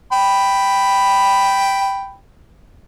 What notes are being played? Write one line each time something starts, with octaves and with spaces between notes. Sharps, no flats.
G5 B5